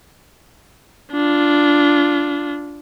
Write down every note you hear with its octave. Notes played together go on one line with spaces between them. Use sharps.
D4 F4